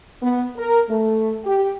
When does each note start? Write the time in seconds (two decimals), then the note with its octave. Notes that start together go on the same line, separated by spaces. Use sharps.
0.21 B3
0.55 A#4
0.88 A3
1.43 G4